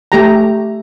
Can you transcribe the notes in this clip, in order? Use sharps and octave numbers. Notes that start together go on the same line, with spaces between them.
A3 G4 A#5